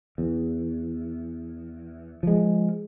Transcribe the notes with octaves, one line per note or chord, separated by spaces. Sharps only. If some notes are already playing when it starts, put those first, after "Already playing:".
E2
F3 G#3